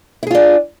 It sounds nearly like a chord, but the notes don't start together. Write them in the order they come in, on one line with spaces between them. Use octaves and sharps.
E4 G#4 F4 D4